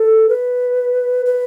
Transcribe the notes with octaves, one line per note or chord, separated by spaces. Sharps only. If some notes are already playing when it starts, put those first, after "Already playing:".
Already playing: A4
B4
B4